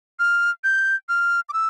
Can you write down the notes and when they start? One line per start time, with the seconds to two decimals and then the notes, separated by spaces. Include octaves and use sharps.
0.19 F6
0.64 G6
1.09 F6
1.49 D6
1.53 E6